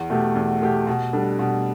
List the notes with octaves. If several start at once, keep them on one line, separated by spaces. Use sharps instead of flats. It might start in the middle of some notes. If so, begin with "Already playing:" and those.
Already playing: E2
B2 A3 G4
E2
B2 A3 G4
B2
G3 D4 A4
B2